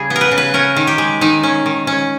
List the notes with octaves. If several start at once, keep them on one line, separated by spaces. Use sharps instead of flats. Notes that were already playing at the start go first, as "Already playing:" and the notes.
Already playing: C#3 G3 G#4
B3
A#4
B4
C#3
B4
C#4 A#4
D#3
G4
G#3
D#3 D#4
C#4
D#3
C#4